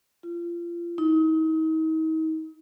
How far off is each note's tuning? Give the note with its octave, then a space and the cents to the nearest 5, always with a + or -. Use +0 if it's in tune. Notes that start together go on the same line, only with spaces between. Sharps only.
F4 -30
D#4 +40